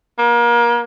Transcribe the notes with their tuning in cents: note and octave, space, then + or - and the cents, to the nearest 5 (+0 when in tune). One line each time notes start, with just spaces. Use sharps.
A#3 +30